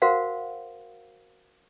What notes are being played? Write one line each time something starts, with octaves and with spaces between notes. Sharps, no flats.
F#4 A#4 C5 F5 F#5